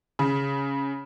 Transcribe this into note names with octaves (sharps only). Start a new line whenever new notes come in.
C#3